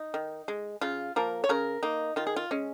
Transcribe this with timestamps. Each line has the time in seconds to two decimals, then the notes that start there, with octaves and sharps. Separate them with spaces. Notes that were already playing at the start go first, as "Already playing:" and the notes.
Already playing: D#4
0.14 D#3
0.48 G#3
0.81 C#3 F4
1.16 F3 A#3 A#4
1.44 C#5
1.49 C#3 A#4
1.83 A#3 D#4
2.16 D#3 F4
2.27 G#4
2.36 F4
2.51 G#3 C#4